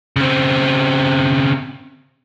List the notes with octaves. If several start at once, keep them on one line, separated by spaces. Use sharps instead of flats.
C#3 C4